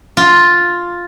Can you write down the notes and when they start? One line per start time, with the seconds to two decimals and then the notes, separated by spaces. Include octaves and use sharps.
0.17 F4